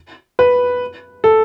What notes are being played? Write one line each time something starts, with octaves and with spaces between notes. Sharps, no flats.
B4
A4